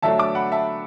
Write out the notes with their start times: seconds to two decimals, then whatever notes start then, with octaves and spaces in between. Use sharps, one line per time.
0.02 D3 F#3 A3 D4 E5 A5
0.18 A5 D6
0.35 F#5 B5
0.52 E5 A5